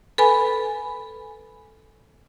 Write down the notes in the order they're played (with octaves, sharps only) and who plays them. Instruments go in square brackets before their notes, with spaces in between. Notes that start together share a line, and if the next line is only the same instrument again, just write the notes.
[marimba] A4 B4 G#5 B5